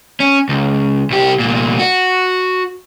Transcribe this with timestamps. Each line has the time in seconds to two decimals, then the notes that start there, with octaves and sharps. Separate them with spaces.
0.20 C#4
0.49 C#2
1.10 C2 G4
1.40 C2 A#2
1.79 F#4